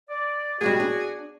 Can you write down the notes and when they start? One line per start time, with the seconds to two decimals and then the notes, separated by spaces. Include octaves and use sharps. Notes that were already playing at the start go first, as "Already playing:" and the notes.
0.09 D5
0.61 G3 G#3 A#3 F#4 G#4
0.80 D4